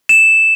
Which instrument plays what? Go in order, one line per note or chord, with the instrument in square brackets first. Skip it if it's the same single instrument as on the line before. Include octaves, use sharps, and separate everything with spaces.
[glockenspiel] E7